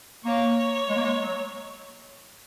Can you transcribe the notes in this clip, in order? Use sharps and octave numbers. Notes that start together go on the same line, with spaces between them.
A#3 C#5
G#3
A#3
G#3
F#3